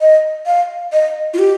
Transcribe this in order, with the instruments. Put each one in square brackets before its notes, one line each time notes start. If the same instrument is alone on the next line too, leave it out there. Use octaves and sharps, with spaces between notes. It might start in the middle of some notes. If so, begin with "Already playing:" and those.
[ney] D#5
F5
D#5
F4
G4